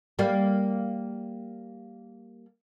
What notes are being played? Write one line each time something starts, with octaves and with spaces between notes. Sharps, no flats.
G3 A#3